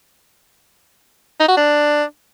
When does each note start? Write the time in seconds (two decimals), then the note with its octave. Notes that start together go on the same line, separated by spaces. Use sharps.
1.40 D#4
1.48 F#4
1.57 D4